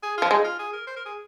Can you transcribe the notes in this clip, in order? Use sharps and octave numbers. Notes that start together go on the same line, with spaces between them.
G#4
F3 F4
G#3 D#4
F4
G#4
A#4
C5
A#4
G#4